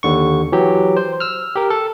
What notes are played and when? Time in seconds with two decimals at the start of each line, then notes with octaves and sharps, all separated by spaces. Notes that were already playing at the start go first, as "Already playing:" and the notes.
0.03 D#2 D3 C#6
0.52 E3 F#3 G4
0.97 C5
1.20 E6 F6
1.56 G4 A#4
1.70 A4